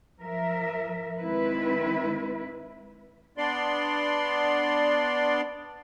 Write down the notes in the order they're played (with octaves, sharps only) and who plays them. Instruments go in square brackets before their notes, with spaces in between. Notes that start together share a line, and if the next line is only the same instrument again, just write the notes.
[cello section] F3 A#4 E5
D#3 G#3 C4 E4 B4
[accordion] B3 D4 D5 C6